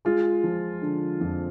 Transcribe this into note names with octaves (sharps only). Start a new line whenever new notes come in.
G#3 F4
F3
D3
F2